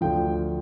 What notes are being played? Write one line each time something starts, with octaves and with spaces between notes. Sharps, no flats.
D2 D3 F3 G5